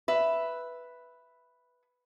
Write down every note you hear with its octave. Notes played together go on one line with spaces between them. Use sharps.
B4 E5